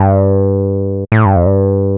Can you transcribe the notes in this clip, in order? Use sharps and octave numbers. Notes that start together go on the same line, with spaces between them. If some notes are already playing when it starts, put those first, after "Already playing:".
Already playing: G2
A2
G2
F2
G2